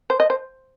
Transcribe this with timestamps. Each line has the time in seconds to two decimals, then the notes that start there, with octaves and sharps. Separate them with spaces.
0.10 C5
0.20 D#5
0.30 C5